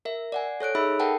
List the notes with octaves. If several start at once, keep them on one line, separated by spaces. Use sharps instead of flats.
A#4 E5
D5 F#5 G#5
A4 C#5 F#6 D7
D#4 G#4 E5 B5 E6
A4 A#4 F#5 G5 A5